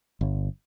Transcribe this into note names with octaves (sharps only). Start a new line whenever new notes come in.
G1